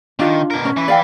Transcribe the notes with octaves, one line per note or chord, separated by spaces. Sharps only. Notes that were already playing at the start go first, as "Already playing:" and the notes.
D#3 D4 F4
B2 A#4
C#4
E3 B4
D5 F5 G5